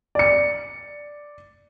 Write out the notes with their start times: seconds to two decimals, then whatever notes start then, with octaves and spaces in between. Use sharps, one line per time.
0.15 D5 C#7